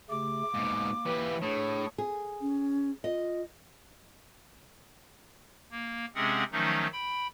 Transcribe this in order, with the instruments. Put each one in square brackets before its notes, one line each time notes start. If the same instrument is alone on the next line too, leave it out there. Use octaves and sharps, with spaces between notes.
[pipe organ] C#3 A3 G4 [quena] D6
[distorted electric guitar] G#2 B2 [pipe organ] A#3
[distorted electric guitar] E3 G4 [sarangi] B4
[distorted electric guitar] A2 [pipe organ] D4 G#4 [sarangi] C#5
[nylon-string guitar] G#4
[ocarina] C#4
[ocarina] F4 [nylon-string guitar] D#5
[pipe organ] A#3
C3 G#3 C4 C#4 G#4 F#5
D#3 F3 F#3 A3 C#4 D#4
G5 B5